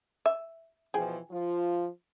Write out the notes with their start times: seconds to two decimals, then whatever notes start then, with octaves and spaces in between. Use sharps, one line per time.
0.26 E5
0.94 B2 E3 F3 G#4 G5
1.31 F3 F4